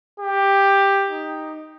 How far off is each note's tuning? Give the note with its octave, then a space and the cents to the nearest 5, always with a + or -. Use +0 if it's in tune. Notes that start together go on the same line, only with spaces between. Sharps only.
G4 +10
D#4 +0